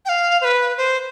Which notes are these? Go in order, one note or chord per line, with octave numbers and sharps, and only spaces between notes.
G5
F5
C5
B4
C5